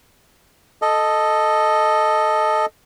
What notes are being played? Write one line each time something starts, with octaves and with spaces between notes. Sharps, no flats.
A4 D#5